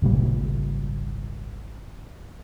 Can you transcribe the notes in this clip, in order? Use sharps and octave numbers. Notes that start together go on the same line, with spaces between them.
G#1 C#2 A#2 G3